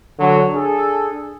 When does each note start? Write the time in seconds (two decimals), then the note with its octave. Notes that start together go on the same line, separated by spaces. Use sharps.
0.19 D3 F#3
0.54 D4 G#4 A4